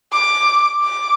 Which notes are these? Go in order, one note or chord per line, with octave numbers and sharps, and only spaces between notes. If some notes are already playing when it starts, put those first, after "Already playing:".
D6
D6